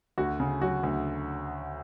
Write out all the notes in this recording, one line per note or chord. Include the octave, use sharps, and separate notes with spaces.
D2 F#4
C#3
F#3 F#4
D2